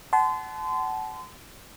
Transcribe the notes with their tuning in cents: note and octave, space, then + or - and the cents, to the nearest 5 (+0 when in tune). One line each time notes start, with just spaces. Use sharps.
F#5 +30 A5 -30 C6 -30